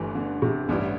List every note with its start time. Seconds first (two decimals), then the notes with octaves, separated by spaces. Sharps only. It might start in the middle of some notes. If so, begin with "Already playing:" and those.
Already playing: G1 G2 E3 G3 A3
0.15 D3
0.42 C3
0.69 A1 G2 D3 G3 E4